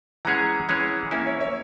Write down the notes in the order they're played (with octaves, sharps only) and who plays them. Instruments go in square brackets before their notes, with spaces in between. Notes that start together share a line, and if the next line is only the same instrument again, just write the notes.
[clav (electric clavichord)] E3 G#3 C#4 G#4 C#5 [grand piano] F#5 A#5
[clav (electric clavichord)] E3 G#3 C#4 G#4 C#5
[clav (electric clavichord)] A#3 C#4 E4 [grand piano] E5 G#5
[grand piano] C#5 E5
C#5 E5